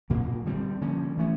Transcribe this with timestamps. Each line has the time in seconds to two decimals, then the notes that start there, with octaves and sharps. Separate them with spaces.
0.10 A#2 F#3 A#3
0.45 D3 G3 C4
0.81 D3 F3 A#3 C#4
1.17 E3 A3 C#4